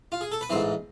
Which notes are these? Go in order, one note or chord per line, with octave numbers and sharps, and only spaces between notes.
F4
G#4
A4
B4
A1 G#2 E3 C4 C5